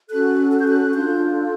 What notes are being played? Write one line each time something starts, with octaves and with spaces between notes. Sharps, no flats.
C#4 F#4 A4 F#6
F#6
G6
F#6
D4 F4 A4 G6